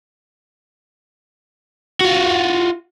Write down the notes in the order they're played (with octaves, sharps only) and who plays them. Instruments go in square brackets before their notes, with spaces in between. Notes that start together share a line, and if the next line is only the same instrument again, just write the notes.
[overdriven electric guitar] F4 F#4